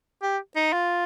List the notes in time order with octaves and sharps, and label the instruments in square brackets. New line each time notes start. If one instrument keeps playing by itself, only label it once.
[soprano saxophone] G4
D#4
F4